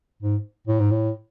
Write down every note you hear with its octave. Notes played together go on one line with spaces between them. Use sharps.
G#2
A2
G#2
A2